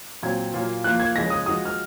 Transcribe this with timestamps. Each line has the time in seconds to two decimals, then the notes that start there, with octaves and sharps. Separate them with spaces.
0.23 A#2 F#3 C4 G#6
0.54 A#2 F#3 A#3 F4
0.84 F3 A#3 F4 F#6
1.00 G#6
1.15 C#3 F3 G#3 D#4 A#6
1.30 D#6
1.46 F3 G#3 D#4 F#4 D#6
1.65 F6